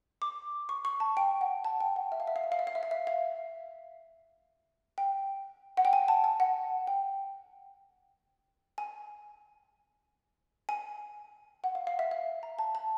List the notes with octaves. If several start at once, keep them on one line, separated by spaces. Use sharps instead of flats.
D6
C#6
C#6
A5
G5
F#5
A5
G5
F#5
E5
F5
E5
F5
E5
F5
E5
F5
E5
F5
E5
F5
G5
F#5
G5
G#5
A5
G#5
F#5
G5
G#5
G#5
F#5
F5
F5
E5
F5
A#5
A5
A5